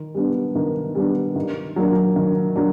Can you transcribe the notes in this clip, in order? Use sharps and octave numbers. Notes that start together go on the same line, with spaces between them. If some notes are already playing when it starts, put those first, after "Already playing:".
Already playing: D#3
G3 B3 D4
D#3
G3 B3 D4
D#3
F#3 A#3 D4
D#3
F#3 A#3 D4